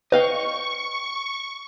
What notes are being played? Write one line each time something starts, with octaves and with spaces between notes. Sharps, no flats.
B4 D#5 F5 G5 C#6